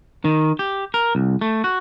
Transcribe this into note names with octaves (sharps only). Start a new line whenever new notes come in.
D#3
G4
A#4
C2
A3
F#4